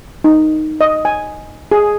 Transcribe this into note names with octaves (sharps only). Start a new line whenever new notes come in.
D#4
D#5
G#5
G#4